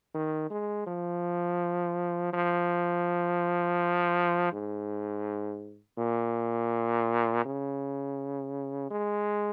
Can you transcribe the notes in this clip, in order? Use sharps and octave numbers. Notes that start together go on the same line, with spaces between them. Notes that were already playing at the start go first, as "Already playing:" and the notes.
D#3
G#3
F3
F3
G#2
A#2
C#3
G#3